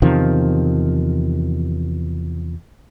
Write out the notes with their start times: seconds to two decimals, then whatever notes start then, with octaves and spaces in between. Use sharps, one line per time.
0.02 E2 C3 D#3 F3